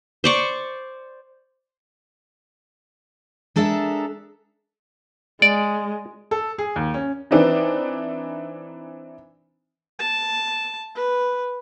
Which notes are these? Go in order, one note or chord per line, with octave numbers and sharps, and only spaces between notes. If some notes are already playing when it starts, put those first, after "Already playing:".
C5 D5 C#6
G#3 D4 A4 A#4 E5
G#3 D5
A4
G#4
D#2
C#4
E3 C4 D4 D#4
A5
B4